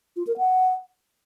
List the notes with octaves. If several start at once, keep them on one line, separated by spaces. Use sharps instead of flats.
F4
A#4
F#5